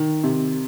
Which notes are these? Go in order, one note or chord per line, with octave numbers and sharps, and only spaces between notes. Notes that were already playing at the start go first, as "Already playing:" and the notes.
Already playing: D#3
C3